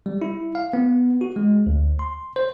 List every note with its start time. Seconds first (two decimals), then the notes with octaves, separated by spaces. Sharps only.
0.06 G3
0.22 E4
0.55 F5
0.73 B3
1.21 F#4
1.36 G#3
1.67 D2
1.99 C6
2.36 C5